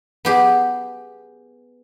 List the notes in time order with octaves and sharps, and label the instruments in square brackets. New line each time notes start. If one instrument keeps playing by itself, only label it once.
[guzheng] B3 G4 G#4